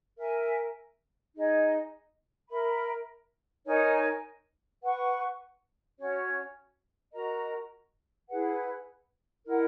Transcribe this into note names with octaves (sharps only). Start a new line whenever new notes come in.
A#4 E5 G#5
D#4 G#4 D#5
A#4 E5 B5
D#4 A#4 C#5 G#5
B4 F#5 C#6
C#4 F#4 C#5
F#4 A#4 D#5 A#5
E4 G#4 B4 F#5
E4 A#4 D#5 F#5